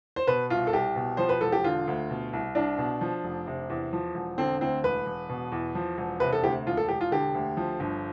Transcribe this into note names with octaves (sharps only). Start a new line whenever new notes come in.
C5
B2 B4
C2 F4
A4
C2 G4
B2
F3 C5
B4
E1 A4
G4
D3 F4
D2
B2
C2
C2 D4
B2
F3
F1
C3
E2
F3
E1
D3 C4
D2 C4
E1 B4
E1
B2
E2
F3
E1
C3 B4
A4
D2 G4
E1 F4
A4
E1 G4
F4
D3 G4
D2
F3
G1